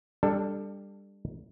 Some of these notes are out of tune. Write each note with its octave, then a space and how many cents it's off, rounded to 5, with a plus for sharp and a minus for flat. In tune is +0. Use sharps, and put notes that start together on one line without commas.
G3 +20 D4 +0 A4 +10